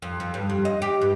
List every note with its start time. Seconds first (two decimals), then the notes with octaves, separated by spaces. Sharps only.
0.02 F2
0.20 F2
0.34 G2
0.49 F2
0.65 D#5
0.82 G4
1.01 G2